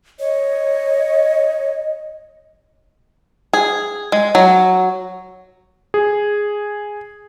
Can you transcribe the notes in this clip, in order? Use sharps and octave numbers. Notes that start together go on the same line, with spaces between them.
C#5 D#5
G#4
G#3
F#3
G#4